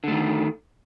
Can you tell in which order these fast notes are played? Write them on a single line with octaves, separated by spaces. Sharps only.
D3 A3 D#3